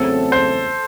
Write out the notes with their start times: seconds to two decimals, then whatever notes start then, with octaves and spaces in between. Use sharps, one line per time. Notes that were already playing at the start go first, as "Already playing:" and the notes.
Already playing: E2 C#3 F#3 A3 C4 A4
0.32 C5